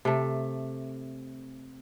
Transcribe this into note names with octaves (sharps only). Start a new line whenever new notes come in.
C3 A3